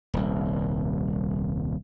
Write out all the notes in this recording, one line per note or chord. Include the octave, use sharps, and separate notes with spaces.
D#1 C2